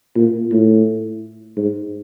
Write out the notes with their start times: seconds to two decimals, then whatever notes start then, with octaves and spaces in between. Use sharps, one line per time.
0.16 A#2
0.52 A2
1.57 G#2